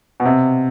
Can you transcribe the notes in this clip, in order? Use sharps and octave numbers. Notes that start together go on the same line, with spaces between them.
B2
C3